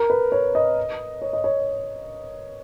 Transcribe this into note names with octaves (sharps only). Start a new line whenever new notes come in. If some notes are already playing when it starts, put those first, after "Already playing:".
Already playing: A#4
B4
C#5
D#5
C#5
D#5
C#5